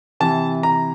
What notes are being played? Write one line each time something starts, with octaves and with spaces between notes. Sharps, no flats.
C3 E3 A5
A#5